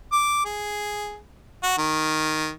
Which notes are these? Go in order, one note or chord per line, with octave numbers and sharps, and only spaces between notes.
D6
G#4
F#4
D#3